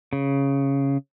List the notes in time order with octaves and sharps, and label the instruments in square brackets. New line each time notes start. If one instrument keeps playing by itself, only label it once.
[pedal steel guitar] C#3